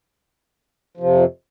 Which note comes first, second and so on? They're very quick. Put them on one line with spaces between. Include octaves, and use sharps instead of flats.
F3 C3 F2